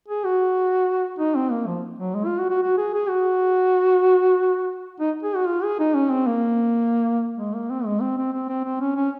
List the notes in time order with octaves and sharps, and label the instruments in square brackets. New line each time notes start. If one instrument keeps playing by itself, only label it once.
[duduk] G#4
F#4
D#4
C4
A#3
F3
F#3
G#3
F4
F#4
F#4
F#4
G#4
G#4
F#4
D#4
G#4
F#4
F4
G#4
D#4
C#4
C4
A#3
G#3
A#3
C4
G#3
C4
C4
C4
C4
C4
C#4
C#4